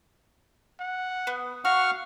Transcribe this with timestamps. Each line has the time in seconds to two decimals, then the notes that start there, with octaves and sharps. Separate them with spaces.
0.80 F#5
1.27 B3
1.65 F#4 F5 F#5 C#6 F6